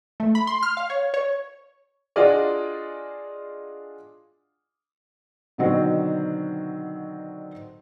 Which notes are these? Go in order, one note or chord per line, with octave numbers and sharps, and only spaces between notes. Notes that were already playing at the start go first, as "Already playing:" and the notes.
A3
B5
C6
F6
F5
C#5
C#5
D4 F4 F#4 G#4 D5 D#5
B2 D3 D#3 F#3 C4 F#4